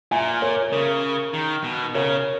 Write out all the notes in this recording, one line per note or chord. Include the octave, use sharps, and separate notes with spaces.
A#2 E5 G#5
A#4 C#5
C#3 A#4
D#3
B2
C#3 A#4 C#5